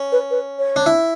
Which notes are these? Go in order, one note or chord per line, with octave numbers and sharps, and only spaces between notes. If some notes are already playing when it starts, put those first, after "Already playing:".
Already playing: C#4
B4
B4
C#5
D4
E4